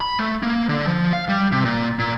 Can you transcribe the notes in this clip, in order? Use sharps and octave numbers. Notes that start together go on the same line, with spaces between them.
B5
A3
A#3
D3
F3
F5
G3
C3
A#2
A#2